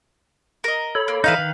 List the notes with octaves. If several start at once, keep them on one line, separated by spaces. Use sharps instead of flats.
A#4 D#5
A4 C#5 B5
A#3
E3 D#4 B4 F5 G6
D#3